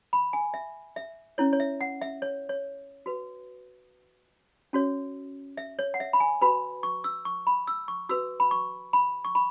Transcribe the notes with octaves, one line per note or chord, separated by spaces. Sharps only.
B5
G#5
E5
E5
C#4 E4 C#5
C#5
E5
F#5
E5
C#5
C#5
F#4 B4
C#4 F#4 C#5
E5
C#5
F#5
E5
B5
G#5
F#4 B4 B5
C#6
E6
C#6
B5
E6
C#6
F#4 B4 E6
B5
C#6
B5
C#6
B5